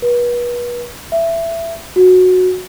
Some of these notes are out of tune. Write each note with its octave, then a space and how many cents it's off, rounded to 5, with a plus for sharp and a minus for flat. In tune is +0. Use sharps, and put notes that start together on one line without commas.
B4 -35
E5 +15
F#4 -10